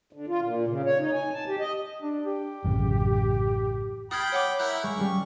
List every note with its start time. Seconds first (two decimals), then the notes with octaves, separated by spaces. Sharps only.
0.13 D3
0.28 F4
0.42 A#2
0.68 C#3
0.85 C#5
0.99 D#4
1.13 G#5
1.34 A5
1.48 G4
1.59 D#5
2.02 D4
2.26 G4
2.64 A1 F#2 C#3
4.11 G5 B5 C6 D#6 F6 G#6 A6 C7
4.32 C#5 F#5 D6
4.59 E4 A#4 F#5 F#6 G6
4.83 G#3 F5 C#6
4.97 G3 C#4